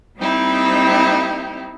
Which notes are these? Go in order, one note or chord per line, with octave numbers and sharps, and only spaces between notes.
G3 A#3 C4 D#4 E4 G4